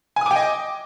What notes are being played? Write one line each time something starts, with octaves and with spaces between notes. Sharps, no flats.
D#5 G5 G#5 D6 D#6